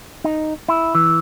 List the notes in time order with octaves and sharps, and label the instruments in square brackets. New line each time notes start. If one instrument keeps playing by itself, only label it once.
[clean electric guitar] D#4
E4
E3